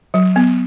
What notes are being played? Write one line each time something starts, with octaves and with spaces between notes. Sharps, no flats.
F#3
B3